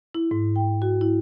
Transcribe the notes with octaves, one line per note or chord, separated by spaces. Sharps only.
E4
G#2
G5
F#4
E4